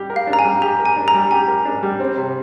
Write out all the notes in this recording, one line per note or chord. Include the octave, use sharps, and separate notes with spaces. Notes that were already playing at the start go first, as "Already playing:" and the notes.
Already playing: G3 G4
A#4
F5
D4
A#5
G#5
G3
G4 A#5
A#4
G#5
D4
A#5
G3
G4 G#5
A#4
D4
G3
C4
C3